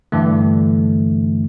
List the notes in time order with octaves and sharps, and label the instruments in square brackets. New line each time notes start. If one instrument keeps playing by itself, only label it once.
[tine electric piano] G2 D3 E3 A3